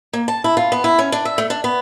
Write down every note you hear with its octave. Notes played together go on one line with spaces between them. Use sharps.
A#3
A5
E4
F4
B3
E4
C#4
D4
E5
A3
D4
B3